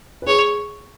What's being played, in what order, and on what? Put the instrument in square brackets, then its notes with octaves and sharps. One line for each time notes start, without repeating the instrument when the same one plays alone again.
[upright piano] B4
[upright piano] G#4 [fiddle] C#5